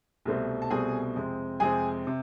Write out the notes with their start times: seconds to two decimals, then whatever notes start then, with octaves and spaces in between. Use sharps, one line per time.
0.25 C2 B2 A3 C4
0.62 A5
0.70 C2 B2 A3 C4 G#4 G#5
1.15 F2 C3 G#3 C4
1.60 F2 C3 G#3 C4 G#4 G#5
2.07 C3